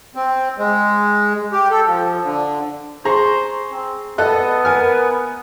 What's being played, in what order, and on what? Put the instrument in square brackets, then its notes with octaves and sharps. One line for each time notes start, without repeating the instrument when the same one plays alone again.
[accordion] C4
G#3
G4
A4
F3
D3
[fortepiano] G#4 A#5 C#6 [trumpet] C5
[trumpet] C4
[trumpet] B3 [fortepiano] A4 D#5 F#6
[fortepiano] A#4 G#5 F6